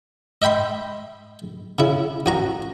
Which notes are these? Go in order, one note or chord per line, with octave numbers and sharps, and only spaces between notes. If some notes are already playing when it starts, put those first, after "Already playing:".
D#5 E5 G5 B5 C6
C#3 E4
A1 F#4 A#5